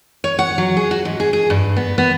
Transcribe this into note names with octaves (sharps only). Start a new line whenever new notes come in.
C#5
F#5
F#3
G#4
F#4
G#2
G#4
G#4
G2
B3
B3